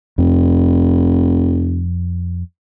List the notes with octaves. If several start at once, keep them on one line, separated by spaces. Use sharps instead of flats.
F1 F2